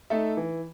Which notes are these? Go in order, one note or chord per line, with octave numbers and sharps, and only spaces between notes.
A3 D#4 A4 E5
E3